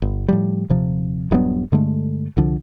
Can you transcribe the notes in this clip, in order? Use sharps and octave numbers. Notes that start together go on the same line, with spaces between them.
G1
A2 F3 G3
D#1 C3 F3
D#1 G2 F#3 B3
G2 D3 G#3 A3
C2 D3 F3